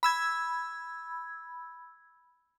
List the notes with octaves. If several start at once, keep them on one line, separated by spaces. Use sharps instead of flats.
B5 E6 G#6